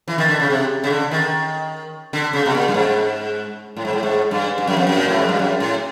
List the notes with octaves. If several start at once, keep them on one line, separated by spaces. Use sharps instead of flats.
E3
D#3
D3
C#3
C3
C#3
D3
D#3
D3
C#3
B2
A#2
G2
G#2
A2
G#2
A2
G#2
G2
G2
F#2
F2
F#2
A#2
A2
G#2
G2
F#2
A2